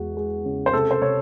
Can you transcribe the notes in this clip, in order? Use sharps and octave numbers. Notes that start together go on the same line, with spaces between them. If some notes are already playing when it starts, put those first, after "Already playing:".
Already playing: E2 G#3 F#4
G#3
C#3
C5
C3 A4
C5
C3 C#5